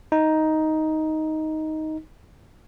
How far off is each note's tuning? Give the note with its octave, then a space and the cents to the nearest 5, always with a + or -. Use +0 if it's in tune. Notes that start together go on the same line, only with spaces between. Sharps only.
D#4 +10